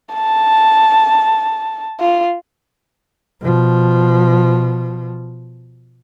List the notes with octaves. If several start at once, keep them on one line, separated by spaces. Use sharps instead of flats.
A5
F4
B2 F3